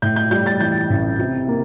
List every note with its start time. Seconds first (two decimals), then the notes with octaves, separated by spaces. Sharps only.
0.02 A2 G6
0.16 G6
0.31 G3 G6
0.46 A6
0.60 E3 G6
0.90 A1
1.19 C3
1.48 A#3